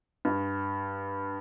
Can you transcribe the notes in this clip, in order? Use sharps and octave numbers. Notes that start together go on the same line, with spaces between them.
G2